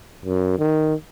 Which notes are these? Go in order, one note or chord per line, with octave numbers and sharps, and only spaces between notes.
F#2
D#3